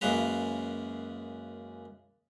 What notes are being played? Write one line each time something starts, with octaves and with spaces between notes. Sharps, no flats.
F#2 C#3 G#3 A#3 B4 A#5